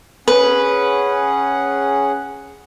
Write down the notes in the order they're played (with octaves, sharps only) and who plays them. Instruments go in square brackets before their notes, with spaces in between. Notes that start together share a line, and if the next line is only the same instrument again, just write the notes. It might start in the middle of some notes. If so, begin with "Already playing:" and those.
[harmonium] C#4 G#4 F#5 [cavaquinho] B4